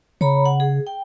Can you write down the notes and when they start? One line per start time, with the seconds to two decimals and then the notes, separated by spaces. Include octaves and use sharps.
0.21 C#3 C#5 A#5 B5
0.46 F#5
0.60 G#4
0.87 G5